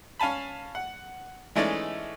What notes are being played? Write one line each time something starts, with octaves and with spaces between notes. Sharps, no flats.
C#4 F5 G#5 A5 B5
F#5
E3 G#3 A3 C#4 D#4 D5